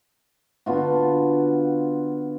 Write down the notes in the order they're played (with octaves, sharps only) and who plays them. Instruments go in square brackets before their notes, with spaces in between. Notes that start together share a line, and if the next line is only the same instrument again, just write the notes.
[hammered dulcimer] D3 B3 F4 F#4